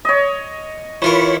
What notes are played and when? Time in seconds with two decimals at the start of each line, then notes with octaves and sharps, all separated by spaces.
0.05 C#5 D#5
1.02 E3 F4 A#4 C#5 B5 C#6